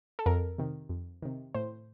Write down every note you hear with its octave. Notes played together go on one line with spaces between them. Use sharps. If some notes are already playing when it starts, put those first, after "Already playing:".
A4
F2 A#4
C3 D#3
F2
C3 D#3
A2 C5